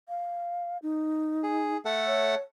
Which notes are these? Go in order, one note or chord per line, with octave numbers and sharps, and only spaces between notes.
F5
D#4
G#4
A3 A4 F#5
C#5